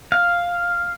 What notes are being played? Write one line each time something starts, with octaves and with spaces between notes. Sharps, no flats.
F5